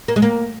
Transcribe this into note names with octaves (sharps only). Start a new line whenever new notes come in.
A#3
G#3
A#3